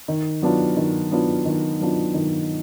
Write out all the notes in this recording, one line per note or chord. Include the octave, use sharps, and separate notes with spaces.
D#3
F#3 B3 D4 F4
D#3
F#3 B3 D4 F4
D#3
F#3 B3 D4 F4
D#3